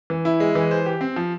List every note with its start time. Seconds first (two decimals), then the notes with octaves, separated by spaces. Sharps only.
0.10 E3
0.25 E4
0.40 G#3
0.55 E3
0.71 C5
0.86 G4
1.01 C4
1.16 F3